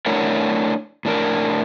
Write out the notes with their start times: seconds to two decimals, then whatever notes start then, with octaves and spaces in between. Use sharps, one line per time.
0.06 A3 D4 E4 A#4 C#5 F#5
1.05 A2 D4 A#4